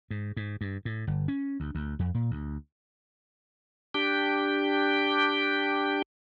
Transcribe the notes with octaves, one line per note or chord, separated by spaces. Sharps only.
G#2
G#2
G2
A2
G1
C#4
D2
D2
F2
A#2
D2
D4 G4 G5